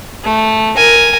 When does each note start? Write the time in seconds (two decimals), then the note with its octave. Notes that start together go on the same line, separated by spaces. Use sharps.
0.24 A3
0.77 A#4 G#5